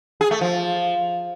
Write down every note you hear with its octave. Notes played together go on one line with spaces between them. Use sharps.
G#4
A3
F3